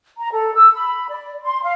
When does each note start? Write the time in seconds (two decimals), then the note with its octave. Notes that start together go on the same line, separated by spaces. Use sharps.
0.18 A#5
0.32 A4
0.55 E6
0.75 B5
1.09 D5
1.43 C6
1.62 F5